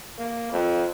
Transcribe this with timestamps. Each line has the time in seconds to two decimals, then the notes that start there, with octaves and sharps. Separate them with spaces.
0.19 A#3
0.52 F2